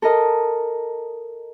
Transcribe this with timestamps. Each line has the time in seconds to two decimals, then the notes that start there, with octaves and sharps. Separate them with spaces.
0.02 A4 A#4 D#5